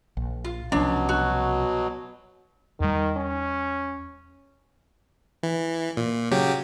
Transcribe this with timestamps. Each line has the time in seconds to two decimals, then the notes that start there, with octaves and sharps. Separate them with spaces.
0.17 A#1
0.44 F4
0.72 C2 B2 F3 F#3 C#4 D4
1.09 F#4
2.80 E2 D#3 G3
3.17 C#4
5.43 E3
5.97 A#2
6.31 C#3 F#3 G4